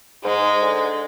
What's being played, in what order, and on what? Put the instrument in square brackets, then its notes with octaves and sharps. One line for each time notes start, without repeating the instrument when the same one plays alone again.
[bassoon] G#2 [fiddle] G#3
[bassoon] D3